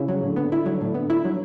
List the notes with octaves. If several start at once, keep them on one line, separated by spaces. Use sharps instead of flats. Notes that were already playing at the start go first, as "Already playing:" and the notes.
Already playing: C#3 E4
F#3
A2 D3
B3
E4
F#3
A2
B3
E4
F#3